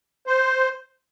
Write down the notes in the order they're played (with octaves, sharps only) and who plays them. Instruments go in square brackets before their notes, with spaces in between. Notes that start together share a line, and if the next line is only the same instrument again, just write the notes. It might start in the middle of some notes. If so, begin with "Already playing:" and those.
[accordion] C5